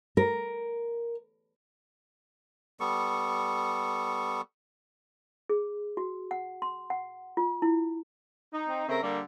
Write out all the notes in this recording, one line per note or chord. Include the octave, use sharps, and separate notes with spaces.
A#4
G3 B3 A4 C#6
G#4
F#4
F#5
C6
F#5
F4
E4
D#4
C4
C#3 A3 C4 A#4
D3 G3 A#3